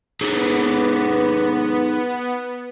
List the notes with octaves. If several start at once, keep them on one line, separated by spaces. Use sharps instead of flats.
B3 D#4 G#4 A4